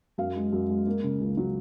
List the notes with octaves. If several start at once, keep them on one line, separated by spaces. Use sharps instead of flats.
F#2 F5
G#3
F#2
G#3
A#3
C#3
C#2
F#3